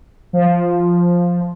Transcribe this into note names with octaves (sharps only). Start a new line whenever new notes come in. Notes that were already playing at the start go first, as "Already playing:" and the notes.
F3